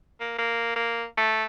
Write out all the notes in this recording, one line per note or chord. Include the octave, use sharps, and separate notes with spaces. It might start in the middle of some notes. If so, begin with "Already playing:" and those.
A#3
A#3
A#3
A3